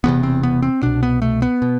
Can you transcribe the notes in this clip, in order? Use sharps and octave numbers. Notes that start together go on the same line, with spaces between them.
E1 E2 C3 B3
C4
B3
C4
C2 B2 D4
B3
A3
B3
B2